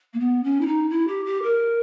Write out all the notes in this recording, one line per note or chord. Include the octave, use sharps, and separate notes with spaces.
A#3
B3
C#4
E4
D#4
E4
G4
G4
A#4